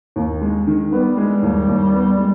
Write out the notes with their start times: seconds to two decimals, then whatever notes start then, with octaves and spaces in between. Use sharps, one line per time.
0.16 D#2
0.42 G#3
0.67 D#3
0.92 G3 B3
1.17 G#3
1.42 D#2
1.67 D#2
1.93 B3
2.18 G#3